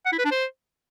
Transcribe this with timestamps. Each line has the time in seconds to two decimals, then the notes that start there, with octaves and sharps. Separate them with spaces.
0.06 F#5
0.12 E4
0.18 B4
0.25 D4
0.31 C5